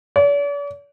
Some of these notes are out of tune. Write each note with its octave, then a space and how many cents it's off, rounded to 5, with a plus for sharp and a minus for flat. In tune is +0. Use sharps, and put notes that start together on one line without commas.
D5 -45